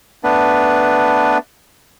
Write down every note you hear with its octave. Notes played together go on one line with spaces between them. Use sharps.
A3 B3 D4 B4